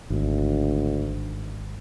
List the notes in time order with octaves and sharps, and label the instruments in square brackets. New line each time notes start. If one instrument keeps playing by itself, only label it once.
[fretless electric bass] G#1 [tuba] D2